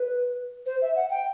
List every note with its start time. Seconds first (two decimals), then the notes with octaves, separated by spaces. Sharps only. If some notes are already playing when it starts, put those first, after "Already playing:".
Already playing: B4
0.66 C5
0.82 E5
0.96 F#5
1.10 G5